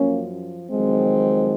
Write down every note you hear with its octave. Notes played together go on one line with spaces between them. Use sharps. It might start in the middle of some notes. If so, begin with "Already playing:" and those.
Already playing: F#2 F3 A#3 C#4
F2 D#3 F#3 G#3 C4